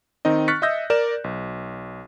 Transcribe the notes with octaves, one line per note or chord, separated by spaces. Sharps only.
D#3 C4 D#4 D#5
C#6 F6 F#6 A6 B6 C#7
D#5 E5 D#6 E6 G6 A#6
A#4 D5 E7
B1